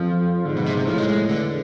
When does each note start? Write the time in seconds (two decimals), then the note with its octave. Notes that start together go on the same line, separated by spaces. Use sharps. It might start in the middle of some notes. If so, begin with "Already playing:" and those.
Already playing: F2 F3
0.45 G#2 D3
0.56 B2
0.66 C3
0.77 C3
0.87 A2 F3
0.98 G#3
1.08 G#3
1.29 E2 D3